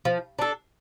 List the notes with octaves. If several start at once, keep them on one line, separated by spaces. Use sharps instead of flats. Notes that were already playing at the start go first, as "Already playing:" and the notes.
F3
D4 A4